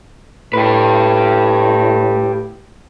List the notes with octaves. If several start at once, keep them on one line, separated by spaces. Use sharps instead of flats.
A2 G4 B4